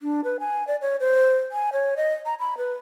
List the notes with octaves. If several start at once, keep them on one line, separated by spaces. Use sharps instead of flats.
D4
B4
G#5
D5
C#5
C5
G#5
C#5
D#5
A#5
B5
B4